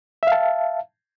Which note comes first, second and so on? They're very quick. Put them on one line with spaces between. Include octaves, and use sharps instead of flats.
E5 F5 A5